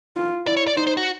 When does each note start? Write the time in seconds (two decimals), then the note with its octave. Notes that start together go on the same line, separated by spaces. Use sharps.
0.16 F4
0.47 E4 D5
0.57 C#5
0.67 D5
0.76 D#4 C5
0.87 C5
0.97 F#4